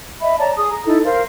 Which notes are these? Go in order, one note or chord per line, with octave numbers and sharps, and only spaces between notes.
D#5 E5 B5
C#5 D5 A5 A#5
G#4 D#6
A#5
D#4 E4 A4
A#4 C5 F5